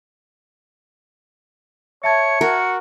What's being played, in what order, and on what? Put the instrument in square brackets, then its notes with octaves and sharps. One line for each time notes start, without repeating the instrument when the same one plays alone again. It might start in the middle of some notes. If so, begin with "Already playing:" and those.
[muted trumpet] C#5 [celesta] E5 A5 G#6 [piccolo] C#7
[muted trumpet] F#4 [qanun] A#4